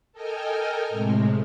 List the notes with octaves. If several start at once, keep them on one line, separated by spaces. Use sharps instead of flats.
A4 A#4 D#5 G5 G#5 F6
A2 C3 G#3